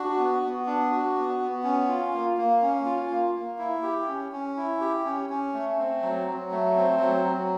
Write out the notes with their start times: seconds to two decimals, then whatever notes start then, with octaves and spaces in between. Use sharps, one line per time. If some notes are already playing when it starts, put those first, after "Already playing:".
Already playing: D4 F#4
0.18 B3
0.43 B3
0.66 D4
0.91 F#4
1.16 B3
1.40 B3
1.64 C#4
1.88 F4
2.13 A#3
2.37 A#3
2.62 C#4
2.85 F4
3.10 A#3
3.35 A#3
3.58 E4
3.83 G4
4.07 C#4
4.32 C#4
4.57 E4
4.80 G4
5.05 C#4
5.30 C#4
5.54 A3
5.78 C4
6.02 F#3
6.27 F#3
6.51 A3
6.76 C4
7.00 F#3
7.25 F#3